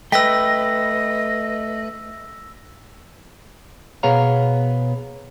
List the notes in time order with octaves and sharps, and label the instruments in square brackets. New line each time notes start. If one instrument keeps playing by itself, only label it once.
[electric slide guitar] A3 B4 [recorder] D#5 [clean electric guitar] G5 [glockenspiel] E6 A#6 B6
[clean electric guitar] B2 B3 G#4 C#5 F5 A#5